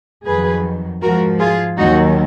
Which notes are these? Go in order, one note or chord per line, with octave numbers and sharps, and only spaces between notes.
F2 D#3 F#3 G#4 B4
G#2 F3 F#4 A#4
F4 G#4
D#2 D#3 F#3 D#4 F#4